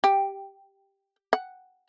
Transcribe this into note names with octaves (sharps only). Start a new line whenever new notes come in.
G4
F#5